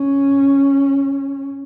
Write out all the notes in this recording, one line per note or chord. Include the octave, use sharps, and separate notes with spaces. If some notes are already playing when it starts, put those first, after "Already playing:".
Already playing: C#4